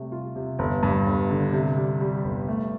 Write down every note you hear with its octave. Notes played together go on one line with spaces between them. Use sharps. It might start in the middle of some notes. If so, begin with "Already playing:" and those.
Already playing: C3 G3 A3
F4
C3
G1
G2
G1
D3
C3
G3
G3
G1
A3